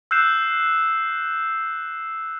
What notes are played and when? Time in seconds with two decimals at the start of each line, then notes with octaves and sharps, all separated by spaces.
0.11 E6 F#6 G6 C7 E7